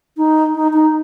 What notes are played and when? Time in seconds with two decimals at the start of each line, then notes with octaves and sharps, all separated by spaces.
0.17 D#4
0.55 D#4
0.73 D#4